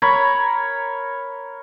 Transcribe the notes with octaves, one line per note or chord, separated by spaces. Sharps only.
A#4 C#5 A#5 B5